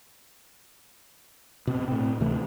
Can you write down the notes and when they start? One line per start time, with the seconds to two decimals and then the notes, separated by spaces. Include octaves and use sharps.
1.67 B2 C4
1.88 A2 C4
2.20 D2 C3 E3 A3